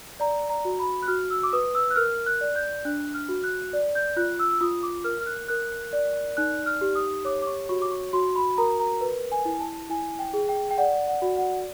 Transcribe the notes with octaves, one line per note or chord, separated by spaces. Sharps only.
D5 A#5
A#5
F#4
B5
F#6
F#4 F6
E6
D6
B4 D#6
E6
F#6
A#4 F6
F#6
D5
G6
D4 F#6
F6
F#4
F#6
D5
G6
F4 F#6
E6
E6
F4 D#6
D6
A#4 F6
F6
F#6
A#4 F#6
D5
D#4 F#6
F6
G4
D#6
C#5 D6
D6
C#6
F#4 C#6
D6
C#6
F#4 C6
B5
A#4 A#5
A#5
B4
G#5
E4
A5
E4 G#5
G5
G#4
G5
G5
D5 F#5
F#5
F#4
F#5